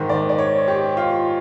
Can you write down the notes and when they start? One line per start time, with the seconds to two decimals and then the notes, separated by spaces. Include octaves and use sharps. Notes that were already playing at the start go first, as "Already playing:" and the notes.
Already playing: G#2 D#3
0.10 D5
0.29 D5
0.38 C#5
0.68 G4
0.97 F4